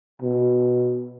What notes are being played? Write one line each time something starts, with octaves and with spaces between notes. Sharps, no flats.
B2